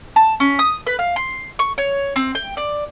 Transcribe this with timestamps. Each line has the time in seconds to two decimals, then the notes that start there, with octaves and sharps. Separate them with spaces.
0.16 A5
0.40 C#4
0.59 D#6
0.87 B4
0.99 F5
1.16 C6
1.59 C#6
1.78 C#5
2.16 C4
2.35 G5
2.57 D5